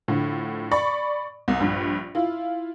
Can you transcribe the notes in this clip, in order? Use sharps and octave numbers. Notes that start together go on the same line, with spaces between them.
A2 D3 F3
D5 B5 C#6
C2
A#1 G2
E4 F4